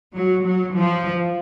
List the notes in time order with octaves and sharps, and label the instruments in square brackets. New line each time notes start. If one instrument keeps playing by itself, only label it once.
[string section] F#3
F#3
F3